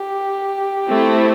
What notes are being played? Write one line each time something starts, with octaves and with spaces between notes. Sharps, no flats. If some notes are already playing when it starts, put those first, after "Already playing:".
Already playing: G4
A3 C4 E4